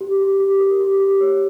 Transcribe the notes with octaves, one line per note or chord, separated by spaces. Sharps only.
G4
G4
G4
A#4
G4
G4
C#5